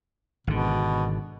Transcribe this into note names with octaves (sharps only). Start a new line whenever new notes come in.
G#1 B2 D3